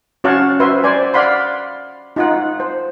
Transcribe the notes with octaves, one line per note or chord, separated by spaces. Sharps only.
C#4 F#4 C#5 F5 F#5 A5
F#4 B4 C5 E5 C6
C5 D5 G#5
D5 F5 F#5 B5 C6
D#4 F4 F#5
C5